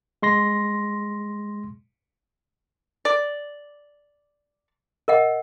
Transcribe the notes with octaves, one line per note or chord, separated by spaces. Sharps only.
G#3 C6 A#6
D5
A#4 D#5 F#5